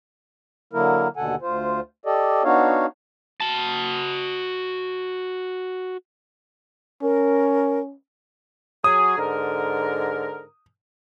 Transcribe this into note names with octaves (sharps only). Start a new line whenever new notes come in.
D3 F#3 A#3 E4 A#4
D#2 B2 D3 A4 F#5 G#5
D2 F4 C5
G4 A4 D5 D#5
B3 D4 D#4 F#4 C#5 F5
F#4 A5
C#4 A#4
F#3 G#4 D#6
G#2 D3 A#4